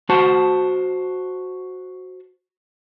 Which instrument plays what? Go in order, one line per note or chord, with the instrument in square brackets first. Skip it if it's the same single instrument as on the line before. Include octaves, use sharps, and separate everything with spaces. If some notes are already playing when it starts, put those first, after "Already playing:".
[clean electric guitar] F#4 C5 A5